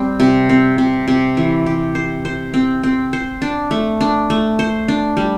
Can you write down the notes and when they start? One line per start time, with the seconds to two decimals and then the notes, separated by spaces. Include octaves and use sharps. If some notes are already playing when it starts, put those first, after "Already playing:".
Already playing: G3 C4
0.20 C3
0.49 C4
0.78 C3
1.08 C3
1.37 E3
1.66 G4
1.95 C5
2.25 C5
2.54 C4
2.83 C4
3.13 C5
3.42 D4
3.71 A3
4.01 D4
4.30 A3
4.59 C5
4.88 D4
5.17 G3